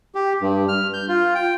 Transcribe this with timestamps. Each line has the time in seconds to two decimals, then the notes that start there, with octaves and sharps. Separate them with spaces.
0.15 G4
0.41 G2
0.68 F6
0.94 G6
1.08 F4
1.35 G5